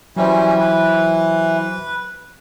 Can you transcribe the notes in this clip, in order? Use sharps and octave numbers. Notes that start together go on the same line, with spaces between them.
E3 F#3 G3 C#4 C5
B4